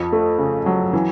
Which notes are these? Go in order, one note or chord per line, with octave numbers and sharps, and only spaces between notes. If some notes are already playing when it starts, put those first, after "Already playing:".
Already playing: F2 F3
A3
C#3
F#3
E3